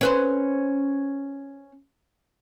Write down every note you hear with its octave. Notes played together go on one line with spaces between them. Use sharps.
C#4 B4 C5